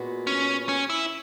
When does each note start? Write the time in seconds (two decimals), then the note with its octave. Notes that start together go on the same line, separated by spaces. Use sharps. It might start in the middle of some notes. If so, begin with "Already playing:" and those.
Already playing: A#2 G#3 B3 F#4
0.27 C#4
0.69 C#4
0.90 E4